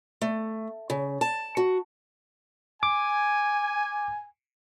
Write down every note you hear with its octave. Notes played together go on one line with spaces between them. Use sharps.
A3
C#3
A5
F#4
G#5 D6